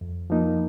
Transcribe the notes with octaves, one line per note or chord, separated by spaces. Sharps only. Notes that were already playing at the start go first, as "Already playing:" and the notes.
F2
F3 A#3 D#4